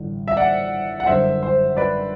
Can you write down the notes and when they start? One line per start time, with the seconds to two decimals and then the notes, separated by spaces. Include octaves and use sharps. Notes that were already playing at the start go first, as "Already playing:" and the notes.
Already playing: A1 G2 D3
0.28 E5
0.37 D5 F#5
1.00 F#5
1.06 G1 F#2 D3 C5 E5
1.43 C5
1.77 B4 D5